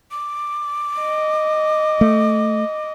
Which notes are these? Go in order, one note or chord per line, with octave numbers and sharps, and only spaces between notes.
D6
D#5
A3